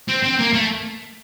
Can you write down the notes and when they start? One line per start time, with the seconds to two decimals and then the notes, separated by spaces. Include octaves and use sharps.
0.08 C4
0.23 C4
0.39 A#3
0.53 A3